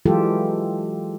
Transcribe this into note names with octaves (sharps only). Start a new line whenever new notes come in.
E3 F#3 G#3 F4 G4 A4